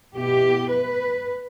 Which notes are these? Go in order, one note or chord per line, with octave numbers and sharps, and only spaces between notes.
B2 B3 E4 G4
B4